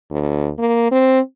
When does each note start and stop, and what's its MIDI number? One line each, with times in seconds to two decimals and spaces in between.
0.11 0.49 38
0.59 0.88 58
0.92 1.20 60